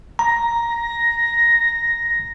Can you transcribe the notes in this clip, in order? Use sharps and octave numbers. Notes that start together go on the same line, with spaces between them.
A#5 A#6